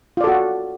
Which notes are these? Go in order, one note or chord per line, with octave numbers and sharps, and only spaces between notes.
F4 F#4 A4 D5